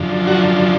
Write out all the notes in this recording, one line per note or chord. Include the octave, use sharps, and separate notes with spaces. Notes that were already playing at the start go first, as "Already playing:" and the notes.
Already playing: F#2 D3 F3
F#4